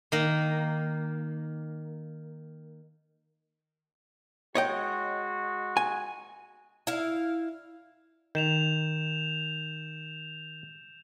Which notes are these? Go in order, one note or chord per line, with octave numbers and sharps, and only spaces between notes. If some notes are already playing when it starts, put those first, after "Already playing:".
D#3 A#3
G#3 F#4 C#5 D#5 G5
G#5
E4 F5
D#3 G6 E7 F7